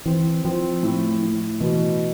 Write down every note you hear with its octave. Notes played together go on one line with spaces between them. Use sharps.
E3 C4
F3 C4
A2
A2
B2 E3